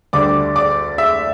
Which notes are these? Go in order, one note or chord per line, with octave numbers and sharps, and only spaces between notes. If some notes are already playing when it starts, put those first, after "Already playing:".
D2 D3 G3 D5 D6
D5 D6
E5 E6